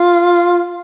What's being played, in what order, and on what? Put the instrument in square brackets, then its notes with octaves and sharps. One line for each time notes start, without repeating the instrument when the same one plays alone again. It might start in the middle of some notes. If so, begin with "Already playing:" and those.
Already playing: [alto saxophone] F4